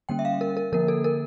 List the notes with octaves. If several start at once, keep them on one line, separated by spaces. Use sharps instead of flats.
D3 G3 A#3 C#4 G5
E5
F5
A#4
A#4
D3 F3 A#3 A#4
A4
A#4